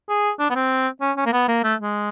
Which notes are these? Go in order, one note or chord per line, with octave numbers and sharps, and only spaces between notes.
G#4
D4
B3
C4
C#4
C#4
A#3
B3
A#3
A3
G#3